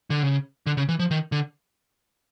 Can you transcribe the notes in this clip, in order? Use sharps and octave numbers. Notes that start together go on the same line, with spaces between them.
D3
C#3
D3
C#3
E3
F3
D#3
D3